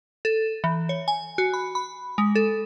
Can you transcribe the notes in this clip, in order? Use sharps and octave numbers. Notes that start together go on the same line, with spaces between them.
A4
E3
C#5
G#5
F#4
B5
B5
G#3
A4